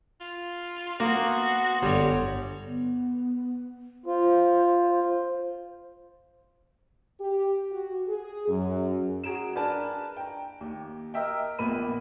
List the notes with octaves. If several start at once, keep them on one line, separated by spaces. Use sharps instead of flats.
F4
A#3 B3 F#4 C6
G1 G3 C#5
B3
F4 C5
G4
F#4
G#4
F#2
F#4 G#4 A#5 D7 E7
D4 A#4 B4 G#5 A5
G5 A#5
D#2
A#4 D#5 E5 G5
A#1 A#2 A#3 B3 B5 D#7